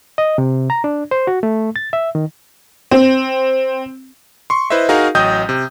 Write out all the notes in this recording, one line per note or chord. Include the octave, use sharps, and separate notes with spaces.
D#5
C3
A#5
D4
C5
F#4
A3
A6
E5
D#3
C4
C6 C#6
E4 B4 C5 D#5 E5
D#4 F#4 G#4 A#4 F5
A1 F#3 D#5 G5 D#6 G6
C3